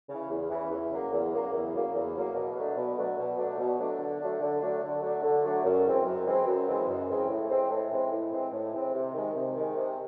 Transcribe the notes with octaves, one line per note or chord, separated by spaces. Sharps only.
C#3 E3
E2
C#3 E3
E2
C#3 F#3 A#3
E2
C#3 F#3 A#3
E2
C#3 F#3 A#3
E2
C#3 F#3 A#3
B2
F#3 A3 D4
B2
F#3 A3 D4
B2
F#3 A3 D4
B2
F#3 A3 D4
D3
F#3 A3 D4
D3
F#3 A3 D4
D3
F#3 A3 D4
D3
F#3 A3 D4
F#2
C#3 E3 G#3 C4
F#2
C#3 E3 G#3 C4
F#2
C#3 E3 G#3 C4
F#2
C#3 E3 G#3 C4
A2
E3 G#3 C4
A2
E3 G#3 C4
A2
E3 G#3 C4
A2
E3 G#3 C4
C3
D#3 G#3
C3
D#3 G#3
C3